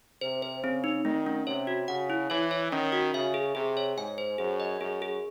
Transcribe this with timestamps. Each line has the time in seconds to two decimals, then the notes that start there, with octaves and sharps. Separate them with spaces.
0.21 C3 C5
0.42 C5
0.63 C#3 C4
0.84 D#4
1.05 D#3 A3
1.26 C#4
1.47 C3 C#5
1.67 F#4
1.88 C#3 F#5
2.10 E4
2.30 E3 C#5
2.51 C#5
2.72 D#3 C#4
2.92 F#4
3.14 C#3 E5
3.34 G#4
3.55 C3 G#4
3.77 C#5
3.97 G#2 G#5
4.18 C5
4.38 F#2 G#4
4.60 D#5
4.81 F#2 G#4
5.02 G#4